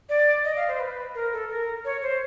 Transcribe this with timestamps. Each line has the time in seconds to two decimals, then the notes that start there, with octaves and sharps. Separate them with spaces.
0.09 D5
0.44 D#5
0.56 F5
0.68 C5
0.80 B4
1.15 A#4
1.33 A4
1.50 A#4
1.85 C#5
2.02 C5